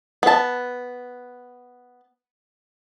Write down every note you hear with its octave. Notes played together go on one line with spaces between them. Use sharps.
B3 A5